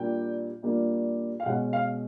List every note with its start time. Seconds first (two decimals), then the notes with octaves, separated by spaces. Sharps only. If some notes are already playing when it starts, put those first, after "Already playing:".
Already playing: A#2 G3 A#3 D4 G5
0.63 A#2 G3 A#3 D4
1.40 F5
1.46 B2 G#3 C#4 F#5
1.73 F5